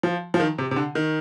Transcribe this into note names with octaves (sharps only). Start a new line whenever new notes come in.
F3
F3
D#3
C3
C3
D3
D#3